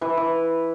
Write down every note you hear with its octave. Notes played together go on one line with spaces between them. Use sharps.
E3 B4
E3